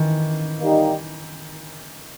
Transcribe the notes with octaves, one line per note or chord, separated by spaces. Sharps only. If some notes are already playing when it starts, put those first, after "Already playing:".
Already playing: D#3 E3
G3 A#3 D#4 G4